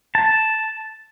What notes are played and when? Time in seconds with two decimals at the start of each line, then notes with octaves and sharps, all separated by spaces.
0.15 A5